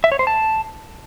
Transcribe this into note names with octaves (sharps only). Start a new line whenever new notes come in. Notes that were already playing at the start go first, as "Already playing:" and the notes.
E5
C#5
C5
A5